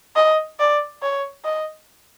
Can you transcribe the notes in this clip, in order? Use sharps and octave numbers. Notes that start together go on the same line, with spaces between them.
D#5
D5
C#5
D#5